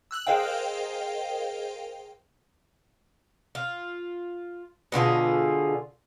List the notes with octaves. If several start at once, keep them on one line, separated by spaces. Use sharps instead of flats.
E6 F#6 F#7
G#4 A#4 C5 D#5 F5 G5
F4
B2 D3 F4 G#4